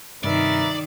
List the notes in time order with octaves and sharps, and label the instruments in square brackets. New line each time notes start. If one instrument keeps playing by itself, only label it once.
[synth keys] G2 C3 G3 [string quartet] D#3 [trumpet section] A#4 B4 E5 [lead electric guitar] D5